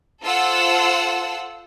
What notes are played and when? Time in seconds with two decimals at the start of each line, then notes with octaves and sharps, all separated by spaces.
0.22 F4 A4 C5 F#5 E6